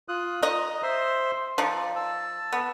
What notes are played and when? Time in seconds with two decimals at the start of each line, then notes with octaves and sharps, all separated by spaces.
0.09 F4 D#6 F#6
0.43 D#4 D#5 A#5 D#6
0.83 C5 E5 C6
1.58 F3 D#4 D5
1.96 A5 E6
2.52 B3